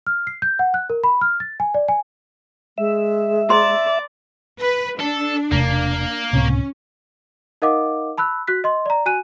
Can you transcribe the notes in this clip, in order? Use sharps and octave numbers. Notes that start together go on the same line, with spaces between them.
F6
C7
G6
F#5
F#6
A#4
B5
F6
A6
G#5
D5
G#5
G#3 E5
C5 D5 A#5 C6
B4
D4 A4
E1 C3 A3 A#3
C#2 A2 C3 C#4
D#4 A#4 D#5 F5 F#5 D6
A5 B5 E6 F#6
F#4 F#6 B6
D#5 C6
D5 A#5
F#4 G#5 F#6 D#7